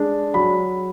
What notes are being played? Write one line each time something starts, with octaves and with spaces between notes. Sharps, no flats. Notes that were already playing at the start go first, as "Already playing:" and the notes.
Already playing: G#3 D4
F#3 B5